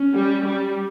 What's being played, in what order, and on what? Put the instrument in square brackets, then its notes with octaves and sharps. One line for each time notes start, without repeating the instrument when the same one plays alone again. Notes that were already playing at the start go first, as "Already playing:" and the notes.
Already playing: [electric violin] C#4
[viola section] G3
G3